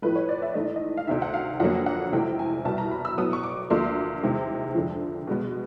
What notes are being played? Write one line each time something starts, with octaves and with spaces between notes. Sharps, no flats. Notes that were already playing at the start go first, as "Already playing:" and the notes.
A2 F3 A3 B4
C#5
D5
E5
G#2 E3 A3 D#5
D5
D#5
F5
D2 C3 D#3 E5
F#5
F5
F2 D3 F#3 A#3 F#5
F#5
C#2 C3 E3 A3 G5
G#5
C2 B2 G3 B3 A5
A#5
B5
E6
A2 F#3 B3 D#6
C#6
D6
D2 D3 F3 A#3 C6
E2 C3 D#3 G#3
F2 D3 F3
B2 G#3 B3